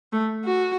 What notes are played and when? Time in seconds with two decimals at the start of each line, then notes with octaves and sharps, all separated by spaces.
0.13 A3
0.45 F#4